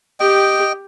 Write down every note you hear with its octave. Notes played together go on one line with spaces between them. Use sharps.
G4 D#5 G5